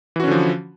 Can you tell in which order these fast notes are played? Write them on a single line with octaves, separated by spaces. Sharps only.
E3 F#4 C#4 D3 F3